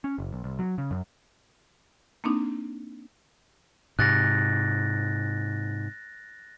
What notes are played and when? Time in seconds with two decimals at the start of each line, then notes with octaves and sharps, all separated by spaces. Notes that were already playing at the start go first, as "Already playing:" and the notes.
0.04 C#4
0.18 F#1
0.33 B1
0.44 C2
0.59 F#3
0.78 C#3
0.91 F#2
2.24 A#3 C4 D4 D#4
3.99 G#2 C3 F#6 A6 A#6